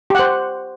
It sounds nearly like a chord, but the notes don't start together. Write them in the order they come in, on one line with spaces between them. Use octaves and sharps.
G4 F#5 C5